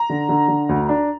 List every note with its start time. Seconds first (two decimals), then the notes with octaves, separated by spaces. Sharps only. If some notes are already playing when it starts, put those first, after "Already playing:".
Already playing: A#5
0.10 D3
0.29 D3
0.48 D3
0.69 D2
0.89 D4